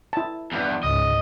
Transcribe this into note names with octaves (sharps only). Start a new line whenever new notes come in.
E4 A5
E2 G2
C#2 G#2 D#5